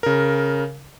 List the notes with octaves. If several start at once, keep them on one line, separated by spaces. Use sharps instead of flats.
C#3 A#4